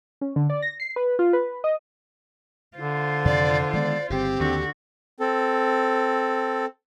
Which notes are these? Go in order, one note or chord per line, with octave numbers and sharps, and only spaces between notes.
C#4
D3
D5
A#6
C7
B4
F4
B4
D#5
D3 F4 C5
F2 C3 D#3 D5
D#3 G#3 B3 D5
G1 C#3 C4 G4
D#2 D3 F#4
C4 A4